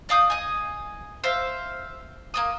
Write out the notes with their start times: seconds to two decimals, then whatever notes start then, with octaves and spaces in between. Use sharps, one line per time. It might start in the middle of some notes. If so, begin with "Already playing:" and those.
0.09 D5 F5 D#6 G6
0.30 D#5 G#5
1.24 C5 E5 F5
2.34 A#3 C#4 D#6